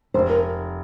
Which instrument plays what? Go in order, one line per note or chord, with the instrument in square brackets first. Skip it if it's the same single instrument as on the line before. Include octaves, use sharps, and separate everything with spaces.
[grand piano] F1 [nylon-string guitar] C5
[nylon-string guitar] A#4